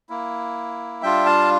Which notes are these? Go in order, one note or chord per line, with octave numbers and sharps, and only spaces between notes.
A#3 E4
G3 D4 F4 E5 G5
F5 A5